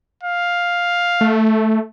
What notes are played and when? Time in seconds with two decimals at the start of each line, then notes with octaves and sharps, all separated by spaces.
0.23 F5
1.21 A3